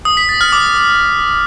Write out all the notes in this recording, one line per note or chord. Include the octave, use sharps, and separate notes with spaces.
D#6
B6
A6
F6
D6